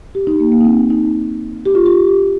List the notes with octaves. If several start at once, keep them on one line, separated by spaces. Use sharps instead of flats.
G4
D#4
A#3
A#3
D#4
C4
D#4
G4
F4
G4